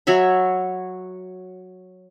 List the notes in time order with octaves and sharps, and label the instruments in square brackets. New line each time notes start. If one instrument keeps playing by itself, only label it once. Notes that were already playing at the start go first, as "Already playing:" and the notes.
[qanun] F#3 C#5 E5 B5